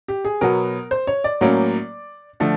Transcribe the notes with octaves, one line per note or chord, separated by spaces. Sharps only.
G4
G#4
B2 F#3 B3 A#4
C5
C#5
D5
A2 F#3 A#3 C#4
D3 F3 A3